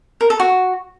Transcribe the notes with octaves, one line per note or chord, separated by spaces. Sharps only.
A#4
A4
F#4